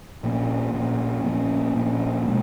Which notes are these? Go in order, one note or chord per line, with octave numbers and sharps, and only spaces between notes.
A#2 F3 A#3 C#4
A#2 F3 A#3 C#4
A#2 F3 A#3 C#4
A#2 F3 A#3 C#4
B2 G#3